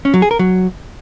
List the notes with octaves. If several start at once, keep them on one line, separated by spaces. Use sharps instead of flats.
C#4
F#3
G#4
A#4
F#3